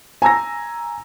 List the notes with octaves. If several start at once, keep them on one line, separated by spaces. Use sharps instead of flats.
G#5 A#5 E6 A#6